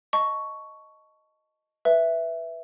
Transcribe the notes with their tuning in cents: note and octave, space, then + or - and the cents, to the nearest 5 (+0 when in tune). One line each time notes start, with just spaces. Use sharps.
D#5 +0 A5 +0 C#6 +10
B4 +0 E5 +0